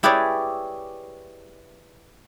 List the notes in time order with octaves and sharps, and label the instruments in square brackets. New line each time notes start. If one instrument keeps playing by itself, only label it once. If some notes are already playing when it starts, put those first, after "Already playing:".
[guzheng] E4 G4 G#4 B4 C#5 D5